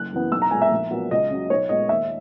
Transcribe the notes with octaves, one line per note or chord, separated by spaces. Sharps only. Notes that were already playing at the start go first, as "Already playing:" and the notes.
Already playing: F#1 F#6
F#2 E3 B3
B1 E6
A#5
A#2 G#3 B3 G#5
E5
A#1
A#2 F#3 B3
C#2 D#5
C#3 F#3
B1 C#5
A#2 G#3 B3 D#5
D#2 E5